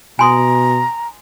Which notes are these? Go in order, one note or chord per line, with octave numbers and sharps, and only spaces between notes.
B2 G#5 A#5 C6 D#6